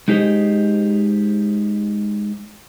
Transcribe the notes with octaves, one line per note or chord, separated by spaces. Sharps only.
G#3 D#4 G4 C5 D#5